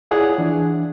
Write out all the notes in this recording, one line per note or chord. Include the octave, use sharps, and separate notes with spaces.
E4 F4 G#4 C#5 D5 F#5
E3 D4